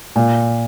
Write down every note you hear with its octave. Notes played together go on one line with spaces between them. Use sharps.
A#2